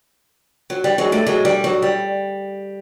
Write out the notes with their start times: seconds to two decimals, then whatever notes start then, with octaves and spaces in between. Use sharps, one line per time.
0.70 F#3
0.84 G3
0.98 F#3 G#3
1.12 G3 A3
1.27 F#3 G#3
1.45 G3
1.64 F#3
1.82 G3